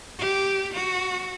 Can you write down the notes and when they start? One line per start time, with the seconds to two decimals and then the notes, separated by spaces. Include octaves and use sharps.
0.18 G4
0.73 F#4